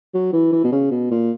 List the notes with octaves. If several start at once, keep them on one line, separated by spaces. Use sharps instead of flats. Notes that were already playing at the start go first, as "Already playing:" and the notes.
F#3
E3
E3
B2
C#3
B2
A#2